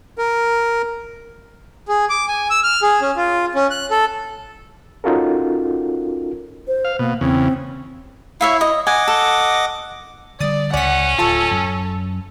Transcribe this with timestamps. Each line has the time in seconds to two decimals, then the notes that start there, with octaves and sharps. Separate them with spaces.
0.18 A#4
1.88 G#4
2.10 D6
2.28 G#5
2.50 E6
2.64 F6
2.82 G#4
3.02 C#4
3.16 F4
3.55 C#4
3.71 F#6
3.91 A4
5.04 C#4 D#4 F4 F#4 A4 A#4
6.67 C5
6.85 F5
6.99 B2 A#3
7.21 E2 C#3 C4
8.41 E4 C#5 E5 F5
8.61 D#5
8.87 D#5 F#5 G#5 D6
9.07 A4
10.40 D3 G3 D5 D#6 A6
10.74 C#2 C#4 D5 F#5 B6
11.18 D1 F4 A4 A5 C#6
11.51 F#2